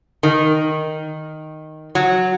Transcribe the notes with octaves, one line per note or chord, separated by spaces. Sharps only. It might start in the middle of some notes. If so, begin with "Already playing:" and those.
D#3
F#3